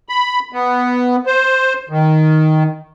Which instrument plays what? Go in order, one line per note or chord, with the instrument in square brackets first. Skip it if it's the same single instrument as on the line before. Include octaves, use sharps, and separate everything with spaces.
[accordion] B5
B3
C5
D#3